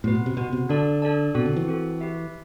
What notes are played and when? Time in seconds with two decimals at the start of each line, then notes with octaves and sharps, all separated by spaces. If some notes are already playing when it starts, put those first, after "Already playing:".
0.04 A2 B3 F#4 B4
0.15 B2
0.26 C3
0.37 B2 B3 F#4 B4
0.53 C3
0.69 D3 D4 A4 D5 A5
1.02 D4 A4 D5 A5
1.34 B2 C4 F#4 A4
1.46 D3
1.56 E3
1.68 C4 F#4 A4
2.01 G4 B4 E5